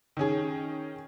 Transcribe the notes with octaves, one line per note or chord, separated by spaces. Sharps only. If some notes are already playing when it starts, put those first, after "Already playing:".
D#3 C#4 G#4